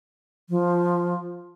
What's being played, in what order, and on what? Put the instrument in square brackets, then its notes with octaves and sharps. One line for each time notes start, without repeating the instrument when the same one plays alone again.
[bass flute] F3